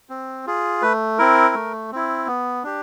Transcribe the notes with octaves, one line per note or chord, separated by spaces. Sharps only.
C4
F4 G#4
A3 B4
C4 E4 A#4
A3
C4 E4
B3
D4 G4